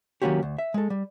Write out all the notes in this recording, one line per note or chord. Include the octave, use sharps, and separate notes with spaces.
D#3 F#3 A#3 C#4 F#4 G4
D2
E5
G#3 A4
G3